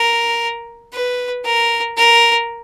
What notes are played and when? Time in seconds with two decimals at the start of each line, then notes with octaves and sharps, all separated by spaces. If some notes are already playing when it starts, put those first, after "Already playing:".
Already playing: A#4
0.93 B4
1.45 A#4
1.97 A#4